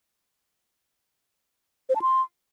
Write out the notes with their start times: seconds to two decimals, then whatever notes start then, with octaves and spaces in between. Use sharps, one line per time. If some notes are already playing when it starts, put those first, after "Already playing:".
1.89 C5
1.95 A5
2.02 C6